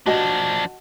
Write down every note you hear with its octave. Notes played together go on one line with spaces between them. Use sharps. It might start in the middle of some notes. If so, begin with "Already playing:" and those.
F3 D4 F#4 D#5 A5